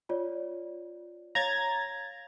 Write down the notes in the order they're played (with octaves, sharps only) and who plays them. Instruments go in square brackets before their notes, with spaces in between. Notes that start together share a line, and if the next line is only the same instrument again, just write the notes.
[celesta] F4 C#5 D5
[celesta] C#5 F5 [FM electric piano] A#5 G#6 A6